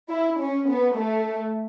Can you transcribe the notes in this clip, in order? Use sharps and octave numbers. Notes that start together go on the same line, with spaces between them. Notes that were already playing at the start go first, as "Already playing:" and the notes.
E4
C#4
B3
A3